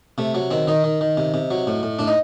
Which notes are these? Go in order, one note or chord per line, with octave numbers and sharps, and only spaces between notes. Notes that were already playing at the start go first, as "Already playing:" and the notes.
C3 A3
F#3
D#3 C4
D#3 D#4
D#3
D#3
C3
C3
F#3
A2
A2
A2 D4
D#4